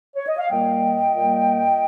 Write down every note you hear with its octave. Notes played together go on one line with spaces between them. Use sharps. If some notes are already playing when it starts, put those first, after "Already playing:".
C#5
D#5
F5
A#2 G3 A#3 D#5 G5
A#2 G3 A#3